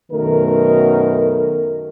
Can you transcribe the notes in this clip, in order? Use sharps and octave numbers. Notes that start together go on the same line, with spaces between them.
F#2 B2 D#3 A3 A#4